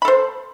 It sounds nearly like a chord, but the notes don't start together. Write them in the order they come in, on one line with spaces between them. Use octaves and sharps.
B5 A4 C5